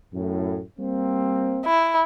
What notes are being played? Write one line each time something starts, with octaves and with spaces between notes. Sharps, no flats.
F#2 A2
G3 A#3 C4
E4